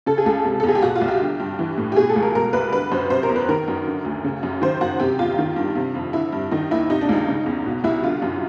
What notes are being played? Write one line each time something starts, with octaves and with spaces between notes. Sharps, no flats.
C#3 A4
G#4
C#2 A4
C3
A4
E2
G#4
G4
B2 F#4
F4
C2
G4
D3
G2
E3
A2
G4
B2 G#4
A4
C#2
A#4
B2 A#4
C2 B4
D3 B4
F#2 C5
C3 C5
A#4
E2
B4
D#3 A#4
F#2
D3
D2
C#3
F#2
D#3 C5
F#2 F#4
C3 G4
E2 F4
D#3
G2
C3
F2
D3 E4
G2
D#3 D#4
D#2 E4
C3 D#4
D4
C#2 D#4
C#3
E2
B2
C2 E4
D3 F4
F#2